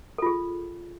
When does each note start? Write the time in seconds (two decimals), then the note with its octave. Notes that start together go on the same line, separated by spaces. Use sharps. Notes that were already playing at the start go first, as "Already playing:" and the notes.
0.18 A4
0.22 F4
0.26 G#4